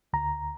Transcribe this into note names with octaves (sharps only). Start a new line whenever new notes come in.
D2 A#5